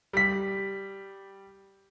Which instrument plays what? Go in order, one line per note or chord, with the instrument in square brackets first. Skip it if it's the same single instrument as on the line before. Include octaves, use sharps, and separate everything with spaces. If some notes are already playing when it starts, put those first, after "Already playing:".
[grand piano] G3 B6